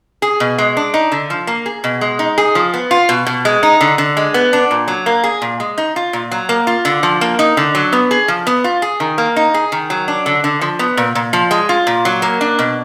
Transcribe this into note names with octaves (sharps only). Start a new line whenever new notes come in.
G#4
B2
G#3
D4
D#4
D3
F3
A#3
G#4
B2
G#3
D#4
G#4
F3
B3
F4
B2
B2
G#3
D#4
D3
D3
G#3
B3
D4
A#2
F#3
A#3
G#4
A#2
G#3
D#4
F4
A#2
F#3
A#3
F4
D3
F3
A#3
D#4
D3
F#3
B3
G#4
F3
B3
F4
G#4
D#3
A#3
D#4
G#4
D#3
F#3
D4
D3
D3
F3
B3
A#2
A#2
F3
G#3
F4
A#2
F#3
A#3
D4
B2